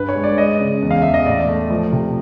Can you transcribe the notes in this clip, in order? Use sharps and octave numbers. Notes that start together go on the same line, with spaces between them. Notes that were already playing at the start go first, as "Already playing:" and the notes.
Already playing: G2 B4
C#5
G#3
D5
G#3 D#5
C#3
E2
F5
E2 E5
D#5
A2 D5
A3
F3
C3